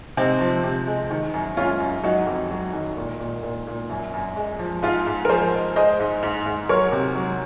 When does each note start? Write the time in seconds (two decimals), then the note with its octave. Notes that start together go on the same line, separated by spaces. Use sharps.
0.17 C3 C4 D#4
0.41 F3
0.64 C3
0.87 G#3
1.11 D#3
1.34 F#2
1.57 F#2 C#4 F4
1.80 F#2
2.04 F#3 D#4 F#4
2.27 F2
2.50 F#3
2.73 D#3
2.97 A#2
3.20 A#2
3.43 A#2
3.67 A#2
3.90 F#2
4.14 F#2
4.36 G#3
4.59 F3
4.82 G#2 F4 G#4
5.06 G#2
5.25 A#4
5.29 F3 G#4 C5
5.53 G#3
5.76 G#3 C5 D#5
5.99 G#2
6.23 G#2
6.46 G#2
6.69 F#3 A#4 C#5
6.92 C3
7.15 F#3